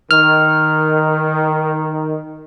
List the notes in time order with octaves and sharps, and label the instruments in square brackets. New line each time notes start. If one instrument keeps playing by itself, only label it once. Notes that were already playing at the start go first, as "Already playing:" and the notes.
[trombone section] D#3 [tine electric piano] F6